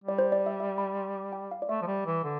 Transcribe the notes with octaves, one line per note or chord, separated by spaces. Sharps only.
G3 D5
C5
D5
E5
E5
B5
C6
D6
G5
F5
D5
A3 E5
F3
G3
E3
D3